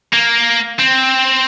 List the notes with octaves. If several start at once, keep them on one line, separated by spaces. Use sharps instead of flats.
A#3
C4